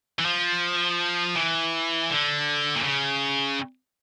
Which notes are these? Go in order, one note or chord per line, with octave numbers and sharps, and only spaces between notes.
E3
F3
E3
D3
A#2
C#3